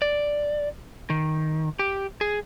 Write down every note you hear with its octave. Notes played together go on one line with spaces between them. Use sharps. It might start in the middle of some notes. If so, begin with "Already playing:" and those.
D5
D#3
G4
G#4